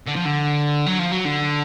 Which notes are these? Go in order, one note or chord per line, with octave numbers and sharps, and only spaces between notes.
D3
F3
D3
F#3
F3
F#3
D3